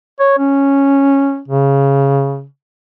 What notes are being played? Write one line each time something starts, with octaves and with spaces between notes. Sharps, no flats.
C#5
C#4
C#3